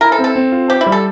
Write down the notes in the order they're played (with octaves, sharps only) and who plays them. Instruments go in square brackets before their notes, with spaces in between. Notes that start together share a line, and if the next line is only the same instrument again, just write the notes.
[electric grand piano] E4 [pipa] A#4
[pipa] A4
[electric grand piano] C4
[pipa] A4
[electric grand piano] C4
F4
[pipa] G4 [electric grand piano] C5
[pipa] E4
[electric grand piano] G3
[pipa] A4